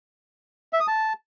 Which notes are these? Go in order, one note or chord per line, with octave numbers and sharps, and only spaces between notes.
E5
D#6
A5